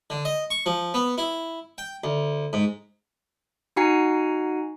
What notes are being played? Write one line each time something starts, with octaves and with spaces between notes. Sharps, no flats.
D3
D#5
C#6
F3
B3
E4
G5
D2
G#2
D#4 F#4 F#5 G#5 A#5 C7